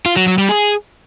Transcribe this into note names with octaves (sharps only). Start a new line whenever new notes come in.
F4
F#3
F#3
G3
G#4